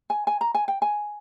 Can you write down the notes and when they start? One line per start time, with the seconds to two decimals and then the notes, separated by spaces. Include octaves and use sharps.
0.10 G#5
0.27 G#5
0.41 A#5
0.55 G#5
0.68 G5
0.82 G#5